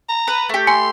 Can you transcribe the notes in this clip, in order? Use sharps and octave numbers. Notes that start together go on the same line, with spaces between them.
A#5
B4
A3 G4
G#5 C6